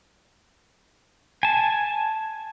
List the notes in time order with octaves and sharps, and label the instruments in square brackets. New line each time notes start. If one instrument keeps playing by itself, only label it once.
[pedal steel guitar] G#5 A5